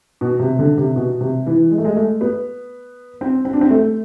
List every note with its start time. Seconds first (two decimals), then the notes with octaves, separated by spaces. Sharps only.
0.21 B2
0.39 C3
0.59 D3
0.78 C3
0.96 B2
1.21 C3
1.47 E3
1.71 G#3
1.78 A3
1.84 G#3
1.96 A3
2.21 B3
3.21 C4
3.45 C4
3.53 D4
3.61 C4
3.70 A3